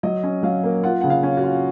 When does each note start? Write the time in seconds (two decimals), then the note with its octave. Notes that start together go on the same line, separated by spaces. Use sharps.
0.03 F#3 D#5
0.23 C#4
0.43 F#3 F5
0.63 A#3
0.83 F4 F#5
1.01 C#3 F#5
1.10 F5
1.23 C#4
1.37 F#4
1.44 F4